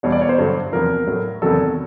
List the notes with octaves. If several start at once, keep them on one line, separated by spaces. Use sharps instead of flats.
E2 B2 G3 C#5
D5
C#5
C5
G2 D3 F#3
E2 C3 F3 A#4
A2 F#3
E2 C3 D#3 F#3 A4